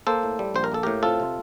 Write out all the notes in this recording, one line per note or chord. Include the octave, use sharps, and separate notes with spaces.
A#3 A4 C5
A2
G3
A#1 C5
A#4
A#3 A4
A2 G4 A#4
C4 F4 A4
C3